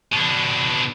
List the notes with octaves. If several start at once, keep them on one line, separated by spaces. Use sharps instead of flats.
B2 D4